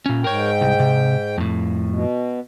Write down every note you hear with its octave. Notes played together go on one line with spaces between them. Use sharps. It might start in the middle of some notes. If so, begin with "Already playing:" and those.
A#2 C#4
G#2 A#4 C#5 G5
C2
C3
F2 A2
B2